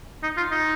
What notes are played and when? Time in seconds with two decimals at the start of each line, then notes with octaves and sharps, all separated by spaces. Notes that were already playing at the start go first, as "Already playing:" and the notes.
0.23 D#4
0.37 F4
0.51 D#4